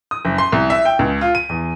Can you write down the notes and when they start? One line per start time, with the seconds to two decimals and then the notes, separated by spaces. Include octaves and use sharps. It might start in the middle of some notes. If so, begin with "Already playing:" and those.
0.11 D#6
0.25 F#1
0.38 C6
0.52 C2
0.70 E5
0.85 G5
0.99 C#2
1.21 F4
1.35 D#7
1.49 E2